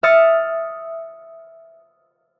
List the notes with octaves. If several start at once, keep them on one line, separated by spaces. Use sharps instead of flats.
E5 D#6 F6 A6 C#7